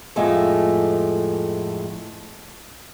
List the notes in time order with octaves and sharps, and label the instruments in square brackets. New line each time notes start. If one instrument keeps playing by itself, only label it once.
[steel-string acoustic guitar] F2 A2 G#3 A3